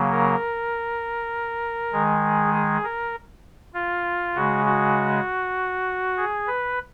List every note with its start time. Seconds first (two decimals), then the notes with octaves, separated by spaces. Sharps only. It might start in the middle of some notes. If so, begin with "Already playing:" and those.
Already playing: C#3 F#3 A#3
0.12 A#4
1.93 D#3 G#3 G#4
2.54 G#4
2.84 A#4
3.74 F4
4.35 C#3 G#3 F#4
4.65 F#4
6.17 G#4
6.47 B4